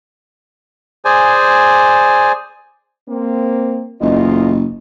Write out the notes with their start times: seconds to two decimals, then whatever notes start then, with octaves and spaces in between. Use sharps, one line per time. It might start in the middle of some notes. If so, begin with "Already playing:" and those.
1.05 G#4 C5 D5 G#5
3.09 A#3 C4
4.02 F#1 E2 F4 D#5